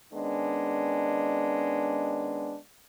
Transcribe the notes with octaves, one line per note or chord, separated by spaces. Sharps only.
D#3 G#3 B3 C#4 D4